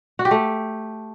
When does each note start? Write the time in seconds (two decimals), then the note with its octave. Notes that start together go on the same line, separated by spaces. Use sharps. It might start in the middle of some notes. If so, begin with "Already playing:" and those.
0.19 F#4
0.25 G4
0.31 A3